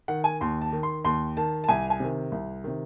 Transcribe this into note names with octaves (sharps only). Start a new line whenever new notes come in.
D#3 F#5
G#5
D#2 C6
A5
D#3
C6
D#2 C6
D#3 A5
A5
C2 G#5
G#5
C3 D#3
C2
C3 D#3